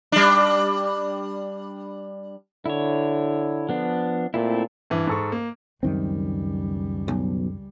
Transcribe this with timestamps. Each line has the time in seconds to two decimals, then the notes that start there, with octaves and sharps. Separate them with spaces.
0.12 G3 D4
2.66 D3 E4 C#5
3.69 F3 B3 D4
4.34 A#2 A3 C4 E4
4.90 G2 E3
5.07 G#2 A4 C#6
5.32 A#3
5.83 C#2 F#2 D#3 G3 C4
7.08 B1